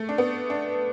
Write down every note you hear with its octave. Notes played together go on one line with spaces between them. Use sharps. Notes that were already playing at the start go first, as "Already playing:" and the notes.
Already playing: A3
D4
B3
D4